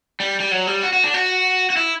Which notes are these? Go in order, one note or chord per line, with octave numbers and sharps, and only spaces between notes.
G3
G3
F#3
G3
F#4
F#4
D4
F#4
F#4
E4